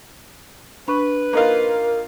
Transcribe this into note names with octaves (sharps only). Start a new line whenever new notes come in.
D4 B4 B5 C#6
A#3 D#4 F4 A#4